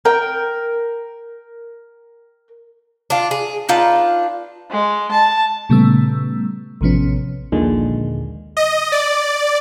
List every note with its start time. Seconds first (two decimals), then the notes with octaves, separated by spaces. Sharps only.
0.05 A#4 G5
3.10 D4 F4
3.31 G#4
3.69 D4 D#4 F4 B4
4.71 G#3
5.12 A5
5.69 A#2 C#3 G3 A3 B3 E6
6.81 A1 C3 F3 B3 C#4
7.52 A#1 D#2 A#2 D3 G#3
8.57 D#5
8.92 D5